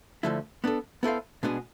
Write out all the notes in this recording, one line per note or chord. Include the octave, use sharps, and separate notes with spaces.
D3 F3 A3 E4
B3 D4 A4
B3 E4 A4 C5 F5
B2 G#3 B3 D4 G#4